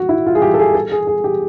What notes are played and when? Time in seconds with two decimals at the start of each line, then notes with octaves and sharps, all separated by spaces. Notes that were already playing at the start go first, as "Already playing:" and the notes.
Already playing: F#4
0.09 E4
0.26 F4
0.35 G#4
0.42 G4
0.54 A4
0.59 G#4
0.74 A4
0.92 G#4
1.07 G#4
1.24 G4